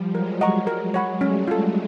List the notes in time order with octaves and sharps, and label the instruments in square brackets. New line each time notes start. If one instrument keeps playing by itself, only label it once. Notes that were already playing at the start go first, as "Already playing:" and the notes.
Already playing: [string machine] F3 G3
[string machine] F#3 G#3 [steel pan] A#4
[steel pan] D#5 F#5 A#5 C#6
A#4
C#5 F#5 B5
[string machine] G3 A3 [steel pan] C#4
[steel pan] F4 A4